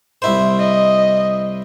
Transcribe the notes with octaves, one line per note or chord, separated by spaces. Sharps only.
C2 E4 C5
D#5